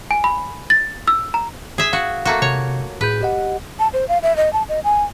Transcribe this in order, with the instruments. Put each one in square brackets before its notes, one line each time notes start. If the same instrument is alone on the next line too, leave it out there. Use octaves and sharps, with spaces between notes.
[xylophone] G#5
B5
A6
E6
A#5
[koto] G#4 E5
[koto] F#4 [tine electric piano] F5
[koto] A3 A#3 F#4
[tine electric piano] C3 [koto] C#5
[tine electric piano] A2 G#4 G6 [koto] B4
[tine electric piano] G4 D#5 F#5
[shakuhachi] A5
C5
F5
E5
D#5
A5
D#5
G#5